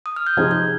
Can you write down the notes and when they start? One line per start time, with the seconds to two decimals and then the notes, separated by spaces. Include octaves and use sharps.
0.06 D#6
0.16 F6
0.27 G6
0.37 C3 F3 C4 D#4 G#4 G#6
0.51 G6